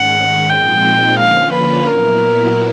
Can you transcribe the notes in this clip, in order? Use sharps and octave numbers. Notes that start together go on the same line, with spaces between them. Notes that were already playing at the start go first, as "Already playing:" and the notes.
Already playing: G#2 D#3 G#3 C#4 F#5
A#2 F3 G#3 C4 D#4 G5
D3 F3 A#3 C#4 F4 F5
B4
A#2 F#3 B3 E4 A#4